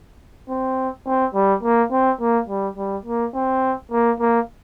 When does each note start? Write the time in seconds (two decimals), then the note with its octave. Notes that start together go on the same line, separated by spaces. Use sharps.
0.49 C4
1.06 C4
1.34 G3
1.63 A#3
1.92 C4
2.20 A#3
2.49 G3
2.77 G3
3.06 A#3
3.35 C4
3.91 A#3
4.20 A#3